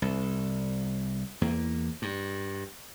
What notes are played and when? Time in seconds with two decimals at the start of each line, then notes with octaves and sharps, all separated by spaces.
0.02 C2
1.41 E2 A#3
2.02 G2